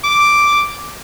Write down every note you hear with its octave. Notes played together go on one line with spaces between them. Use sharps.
D6